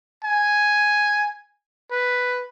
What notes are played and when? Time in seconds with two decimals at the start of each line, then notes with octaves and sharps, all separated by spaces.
0.24 G#5
1.91 B4